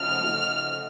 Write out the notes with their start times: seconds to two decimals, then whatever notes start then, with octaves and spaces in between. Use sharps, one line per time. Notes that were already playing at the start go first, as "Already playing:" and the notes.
Already playing: C#3 F3 A3 D#4 F#4 F6
0.21 C#3 F3 A3 D#4 F#4